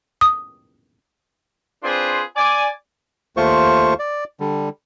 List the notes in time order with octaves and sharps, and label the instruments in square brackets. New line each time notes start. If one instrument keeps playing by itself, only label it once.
[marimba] D#6
[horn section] C4 D4 F4 G#4 B4 C5
D5 G#5
[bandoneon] D#2 A3 F4 C5 C#6
D5
D3 G3